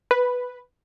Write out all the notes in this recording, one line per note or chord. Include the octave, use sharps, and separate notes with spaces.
B4